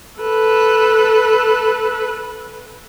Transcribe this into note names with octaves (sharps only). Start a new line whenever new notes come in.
A4 B4